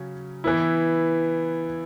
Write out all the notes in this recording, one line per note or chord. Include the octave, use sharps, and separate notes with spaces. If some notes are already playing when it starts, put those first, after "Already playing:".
Already playing: C#3 F#3 C#4
E3 B3 E4